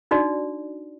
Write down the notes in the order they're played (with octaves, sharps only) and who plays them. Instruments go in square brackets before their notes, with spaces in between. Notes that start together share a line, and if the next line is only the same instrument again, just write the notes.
[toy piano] D4 D#4 F#4 D5